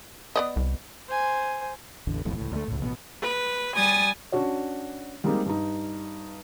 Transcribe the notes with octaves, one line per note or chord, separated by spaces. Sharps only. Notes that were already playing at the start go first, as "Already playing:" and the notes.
B3 D5 D#5
C2
C5 G#5
A1 E2 D3
D#1 B1 F2 A2
C#2 A2
D2 A3
C#2 A2
A1 B2 F3 B3
B4
G3 G#5 D#6 A6
C#4 D4 F#4 C#5
G3 G#3 A#3 C4 D#4 G4
G2 D#4